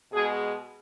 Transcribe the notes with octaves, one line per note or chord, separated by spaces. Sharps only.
B2 G#3 G#4